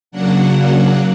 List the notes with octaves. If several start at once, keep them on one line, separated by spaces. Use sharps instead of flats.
C#3 F#3 A#3 D4 F#5